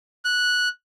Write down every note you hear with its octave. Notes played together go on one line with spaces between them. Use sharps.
F#6